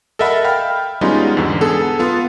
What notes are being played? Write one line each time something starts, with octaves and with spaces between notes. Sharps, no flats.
A4 A#4 D#5 E5 F#5 B5
F5 G5 B5 F6
G3 G#3 B3 C#4 D#4 F4
E2 G#2 D3
B3 G#4 A4
B3 F4 A4